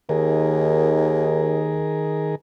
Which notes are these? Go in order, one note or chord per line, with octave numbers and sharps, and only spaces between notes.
D#2 D#3 G#4 A#4